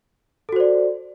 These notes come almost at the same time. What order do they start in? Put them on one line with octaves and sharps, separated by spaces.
A4 F#4 C5 D5